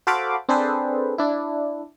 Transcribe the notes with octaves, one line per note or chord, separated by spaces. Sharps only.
F#4 A4 C5 F5 B5 D6
C4 D4 G#4 A4 B4 C5
D4 E4